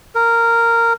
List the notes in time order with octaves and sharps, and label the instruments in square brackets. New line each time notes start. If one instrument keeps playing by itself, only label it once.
[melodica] A#4